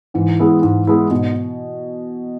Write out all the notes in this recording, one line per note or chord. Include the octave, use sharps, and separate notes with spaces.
G#2 E3
G#3 B3 E4
G#2
G#3 B3 E4
G#2 B2